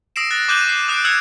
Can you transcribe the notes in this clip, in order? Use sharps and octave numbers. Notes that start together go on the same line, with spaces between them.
D#6 E6 A#6 C7 D7 E7
F#6 A6 A#6
D6 F#6 G6 D#7 E7 F#7
C7
D#6 F#6 C7 D7
E6 F#6 G#6 C7 C#7 F7